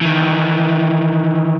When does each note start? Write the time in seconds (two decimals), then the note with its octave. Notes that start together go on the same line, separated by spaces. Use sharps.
0.01 D#3 E3